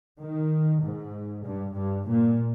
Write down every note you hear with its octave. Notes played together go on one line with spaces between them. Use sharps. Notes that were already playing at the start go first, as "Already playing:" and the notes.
D#3
G#2
G2
G2
A#2